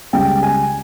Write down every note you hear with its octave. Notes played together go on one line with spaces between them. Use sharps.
C#2 C#3 G3 G5
G#5